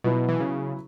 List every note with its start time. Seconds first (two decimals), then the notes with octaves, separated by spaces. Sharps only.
0.04 B2 F#3 B3 E4
0.29 E3
0.40 C#3